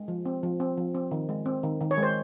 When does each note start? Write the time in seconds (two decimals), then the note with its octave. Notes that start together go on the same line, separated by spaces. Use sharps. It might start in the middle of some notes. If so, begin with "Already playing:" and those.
Already playing: G#3
0.08 F3
0.26 C4
0.43 F3
0.60 C4
0.77 F3
0.95 C4
1.11 D#3
1.29 G#3
1.46 C4
1.63 D#3
1.81 D#3
1.91 C#5
1.97 G#3
2.03 C5